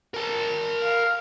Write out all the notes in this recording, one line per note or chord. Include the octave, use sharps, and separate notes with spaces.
A#4 A5
F5